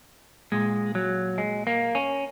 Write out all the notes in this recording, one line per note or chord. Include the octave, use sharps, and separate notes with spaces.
A#2 G#3
F#3
G#3
A#3
C#4